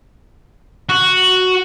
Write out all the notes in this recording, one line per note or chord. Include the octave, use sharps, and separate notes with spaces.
F#4